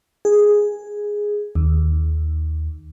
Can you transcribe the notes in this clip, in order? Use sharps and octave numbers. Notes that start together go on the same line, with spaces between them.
G#4
D#2